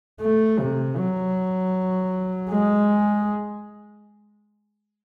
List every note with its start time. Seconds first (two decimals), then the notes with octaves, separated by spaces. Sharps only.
0.22 A3
0.60 C3
0.97 F#3
2.49 G#3